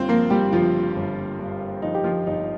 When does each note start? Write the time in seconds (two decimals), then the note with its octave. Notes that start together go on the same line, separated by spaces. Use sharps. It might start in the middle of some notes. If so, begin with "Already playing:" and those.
Already playing: G1 G2 C4 F4 C5
0.09 F3 A#3 A#4
0.30 G3 G4
0.53 G1 F3 F4
0.96 G1
1.39 G2
1.82 F3 D#4
1.95 G4
2.04 F3 F4
2.27 G1 D#4